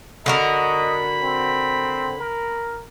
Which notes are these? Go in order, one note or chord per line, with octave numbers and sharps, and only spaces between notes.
D3 F#4 A#4 D#5 B5
C4
A#4